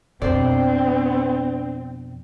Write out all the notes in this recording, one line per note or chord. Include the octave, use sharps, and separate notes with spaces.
F2 B2 C4 D4 C5 D5